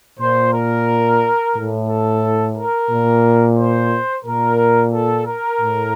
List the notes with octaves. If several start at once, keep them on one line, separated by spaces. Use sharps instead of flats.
A#2 C5
A#4
A2
A4
A#4
A#2
C5
A#2 A#4
A4
A#4
A2